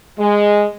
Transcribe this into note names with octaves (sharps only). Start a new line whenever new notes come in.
G#3